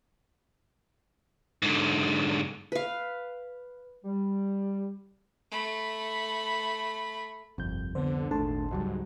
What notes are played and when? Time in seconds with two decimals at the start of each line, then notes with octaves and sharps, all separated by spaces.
1.62 G#2 D3
2.72 B4 F5
4.05 G3
5.51 A3 B5
7.58 G1 C2 F2 G6
7.95 D3 B3 C5
8.31 D#1 G#1 A3 D4 A4 A5 C6
8.71 C#2 G#2 F#3 G3